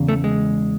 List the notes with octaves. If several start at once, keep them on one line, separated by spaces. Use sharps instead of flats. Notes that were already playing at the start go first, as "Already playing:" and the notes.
Already playing: E2 C#3
A3
G#3